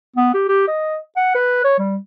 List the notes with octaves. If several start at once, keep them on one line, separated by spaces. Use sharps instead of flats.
B3
G4
G4
D#5
F#5
B4
C#5
G3